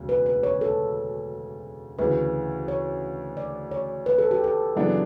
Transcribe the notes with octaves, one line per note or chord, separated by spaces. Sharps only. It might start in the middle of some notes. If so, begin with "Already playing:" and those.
Already playing: E1 D2 C#3
B4
B4
C#5
A4
D2 C#3 E3 B4
C#5
D5
C#5
B4
A4
G4
A4
F#2 C#3 E3 B3 D4